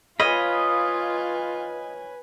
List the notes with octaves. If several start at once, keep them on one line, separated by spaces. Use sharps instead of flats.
F4 B4 C#5 D#5 F5 G#5 B5